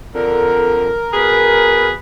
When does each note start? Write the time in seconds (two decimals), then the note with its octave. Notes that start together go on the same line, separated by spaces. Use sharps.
0.15 F2 D3 A#4
1.14 B2 G#4 B4